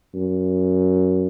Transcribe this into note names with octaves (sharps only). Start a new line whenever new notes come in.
F#2